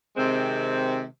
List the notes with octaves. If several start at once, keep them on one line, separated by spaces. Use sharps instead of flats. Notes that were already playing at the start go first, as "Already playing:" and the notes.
C3 D#3 G#3 C4